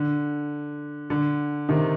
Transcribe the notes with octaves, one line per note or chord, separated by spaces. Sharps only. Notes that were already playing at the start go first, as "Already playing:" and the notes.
Already playing: D3
D3
C3 D#3